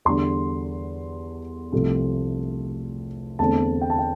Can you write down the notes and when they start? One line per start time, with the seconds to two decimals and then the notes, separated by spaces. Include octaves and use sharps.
0.05 E2 D3 G3 C6
1.72 C2 C3 F3 A3
3.39 E2 D3 A3 C4 A5
3.81 G5
3.90 A5
3.98 G5